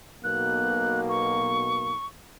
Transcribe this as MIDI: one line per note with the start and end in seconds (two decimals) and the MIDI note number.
0.24 1.94 35
0.24 1.94 47
0.24 1.94 58
0.24 1.00 90
1.09 2.06 85